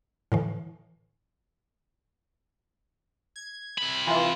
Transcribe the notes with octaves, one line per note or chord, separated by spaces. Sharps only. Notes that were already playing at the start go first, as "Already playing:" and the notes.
A2 D3 E3
G#6
C3 B5
E3 F4